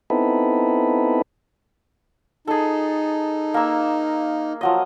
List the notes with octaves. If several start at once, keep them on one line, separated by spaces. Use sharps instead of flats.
B3 C4 D#4 E4 A4 B4
D#4 G#4 A4
A#3 E6
F3 F#3 D#5